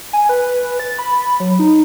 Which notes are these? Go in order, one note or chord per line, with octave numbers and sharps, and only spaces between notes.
G#5
B4
A6
B5
F#3
D#4